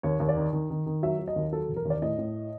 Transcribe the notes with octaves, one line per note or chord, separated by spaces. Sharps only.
D#2 C#5
D#2
D5
D#3
D#3
D#3
D#3
F#3 E5
F#3
D#5
D#2
F#3 A4
E1
A#4
D#2
D5
A2 D#5
A2